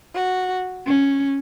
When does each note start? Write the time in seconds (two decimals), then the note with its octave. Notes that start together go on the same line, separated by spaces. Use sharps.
0.13 F#4
0.86 C#4